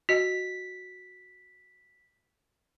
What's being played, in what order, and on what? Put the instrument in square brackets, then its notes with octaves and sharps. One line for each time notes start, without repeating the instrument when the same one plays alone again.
[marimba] F#4 D#5 [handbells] B6